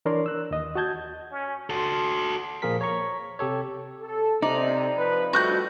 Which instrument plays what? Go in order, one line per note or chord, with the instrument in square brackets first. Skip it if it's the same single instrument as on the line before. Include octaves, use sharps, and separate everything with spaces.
[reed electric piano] E3 D4 A#4 C#5 D5 C6
E6 F#6
D#2 D#5
F#4 D#5 A5 G6 G#6
[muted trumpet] C#4
[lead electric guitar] F#4 A4 [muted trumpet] C6
[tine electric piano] A#2 F3 A#3 G#4 A#4 B6
C#5 A#5 C#6
C3 G4 A4 C#5
[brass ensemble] A4
[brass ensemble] C3 [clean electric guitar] D#4 [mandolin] D5
[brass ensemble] F3 B4
[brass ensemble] F2 G3 A3 [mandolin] F#4 F#6 G6